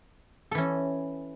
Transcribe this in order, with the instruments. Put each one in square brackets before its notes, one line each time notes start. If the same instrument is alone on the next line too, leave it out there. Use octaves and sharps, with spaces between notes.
[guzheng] A4
E3
C#4